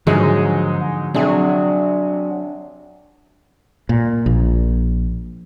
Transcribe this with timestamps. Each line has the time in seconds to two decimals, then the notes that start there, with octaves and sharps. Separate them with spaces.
0.07 D#2 G#2 D3 F3 F#3 G#3 D#4 G#4
1.14 C3 F#3 D4 G#4
3.89 A#2
4.26 A#1